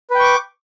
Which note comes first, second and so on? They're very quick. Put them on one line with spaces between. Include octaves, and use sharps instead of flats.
B4 G5 C#6 D6